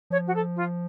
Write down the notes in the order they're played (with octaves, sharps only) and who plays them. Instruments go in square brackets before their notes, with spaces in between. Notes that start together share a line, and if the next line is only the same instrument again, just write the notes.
[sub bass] F3 [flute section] C#5
[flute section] F#4
A4
F4